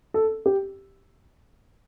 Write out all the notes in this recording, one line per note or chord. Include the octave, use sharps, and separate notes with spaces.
A4
G4